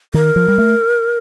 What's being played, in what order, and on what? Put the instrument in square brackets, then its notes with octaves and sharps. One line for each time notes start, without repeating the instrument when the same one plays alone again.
[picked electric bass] D#3 [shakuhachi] A#4
[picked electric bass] F3
G3
A3